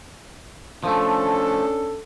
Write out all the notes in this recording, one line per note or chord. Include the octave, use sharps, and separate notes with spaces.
F3 A3 C#4 D4 A4